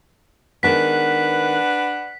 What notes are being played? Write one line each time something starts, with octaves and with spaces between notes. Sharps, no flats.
D#3 G#3 B3 D4 B4 F#5 B6